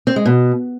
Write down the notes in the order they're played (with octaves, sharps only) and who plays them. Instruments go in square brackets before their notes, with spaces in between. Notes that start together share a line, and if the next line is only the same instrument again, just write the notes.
[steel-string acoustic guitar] C4
G#3
B2